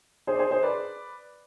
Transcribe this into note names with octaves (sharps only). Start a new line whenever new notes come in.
G#4 C5
D5
G#4 C5
G#4 C5
B4 D5